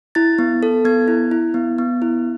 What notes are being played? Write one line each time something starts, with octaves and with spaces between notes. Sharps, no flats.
E4 A6
B3
A4
B3 G#6
E4
E4
B3
B3
E4